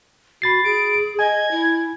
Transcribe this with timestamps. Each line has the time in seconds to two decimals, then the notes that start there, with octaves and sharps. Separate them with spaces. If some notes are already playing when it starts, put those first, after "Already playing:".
0.42 F#4 B5 A6 C7
0.64 G#4 D7
1.19 D#5 G#5 G#6
1.51 E4